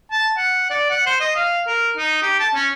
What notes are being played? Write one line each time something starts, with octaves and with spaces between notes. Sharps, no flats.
A5
F#5
D5
F#5
C5
D#5
F5
A#4
D#4
G4
A5
C#4